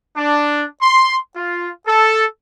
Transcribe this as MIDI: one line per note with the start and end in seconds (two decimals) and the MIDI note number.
0.17 0.66 62
0.82 1.16 84
1.36 1.68 65
1.87 2.25 69